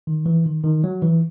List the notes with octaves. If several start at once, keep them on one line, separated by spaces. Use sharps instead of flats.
D#3
E3
D#3
D#3
F#3
E3